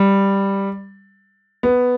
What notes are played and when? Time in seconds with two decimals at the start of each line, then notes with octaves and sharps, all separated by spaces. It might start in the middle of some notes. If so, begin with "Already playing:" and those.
Already playing: G3
1.63 B3